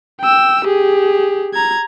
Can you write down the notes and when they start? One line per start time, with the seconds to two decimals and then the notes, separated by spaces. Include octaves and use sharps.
0.21 G5 E6
0.65 G4 G#4
1.54 A#5 G#6